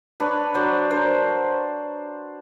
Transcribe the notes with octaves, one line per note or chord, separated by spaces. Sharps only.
D4 B4 C#5
F#3 C5 D5
D4 A#4 C5